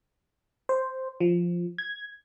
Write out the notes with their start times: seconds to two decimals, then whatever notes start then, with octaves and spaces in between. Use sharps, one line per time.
0.69 C5
1.20 F3
1.78 G#6